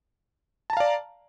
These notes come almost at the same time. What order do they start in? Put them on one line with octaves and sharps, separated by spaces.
A5 A#5 F5 D5